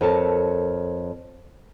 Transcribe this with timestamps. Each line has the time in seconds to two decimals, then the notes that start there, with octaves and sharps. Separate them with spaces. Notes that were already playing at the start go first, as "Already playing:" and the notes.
0.01 F2 A4 A#4 C#5 A5